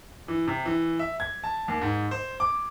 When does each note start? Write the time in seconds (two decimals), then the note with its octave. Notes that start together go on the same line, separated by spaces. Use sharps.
0.28 E3
0.47 C3
0.65 E3
0.99 E5
1.20 G#6
1.44 A5
1.68 D#2
1.81 G#2
2.11 C5
2.40 D6